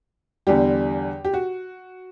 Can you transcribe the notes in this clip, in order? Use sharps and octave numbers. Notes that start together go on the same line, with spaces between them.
E2 D3 G3 G4
G4
F#4